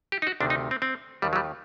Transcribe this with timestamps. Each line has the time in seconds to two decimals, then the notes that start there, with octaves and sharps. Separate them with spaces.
0.12 G4
0.22 D#4
0.27 F#4
0.40 D2 C3 D#3 D4
0.50 D#4
0.71 C4
0.82 C4
1.22 D#2 D#3 G3
1.33 F#3
1.36 G3